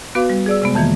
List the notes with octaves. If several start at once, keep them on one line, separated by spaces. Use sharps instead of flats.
B3 F#4 B4 F5 D6
G3
G#4 D5 E6
C3 G#3 B3
F2 D#3 E3 A#3 G#6